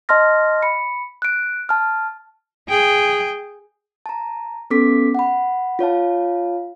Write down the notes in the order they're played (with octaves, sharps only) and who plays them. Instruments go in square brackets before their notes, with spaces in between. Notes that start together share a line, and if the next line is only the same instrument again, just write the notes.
[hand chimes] D#5 A5 C6 F6 A#6
B5 C#7
F#6 D7
A5 F6
[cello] G#4 G5
[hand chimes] A5 A#5
B3 C#4 A4 D6 B6
F#5 B5
F4 C#5 F5 A5